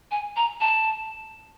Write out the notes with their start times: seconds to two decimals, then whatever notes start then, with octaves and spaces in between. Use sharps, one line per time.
0.11 G#5
0.36 A#5
0.61 A5